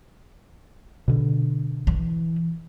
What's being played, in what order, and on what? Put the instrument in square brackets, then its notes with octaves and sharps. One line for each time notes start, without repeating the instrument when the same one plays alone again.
[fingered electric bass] B2 D3
[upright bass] E3